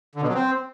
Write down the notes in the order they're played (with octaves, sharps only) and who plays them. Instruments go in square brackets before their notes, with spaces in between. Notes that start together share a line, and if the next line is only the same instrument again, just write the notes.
[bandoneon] D3
B2
F#3
C4